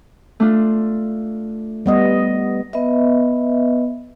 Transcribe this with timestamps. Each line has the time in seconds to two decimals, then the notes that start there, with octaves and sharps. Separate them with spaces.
0.40 A3 D4 F4
1.86 G3 B3 D#5
2.73 B3 B4 D#5 E5